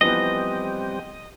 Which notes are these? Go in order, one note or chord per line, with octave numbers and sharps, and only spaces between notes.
E3 F3 G3 B3 C4 G4 D#5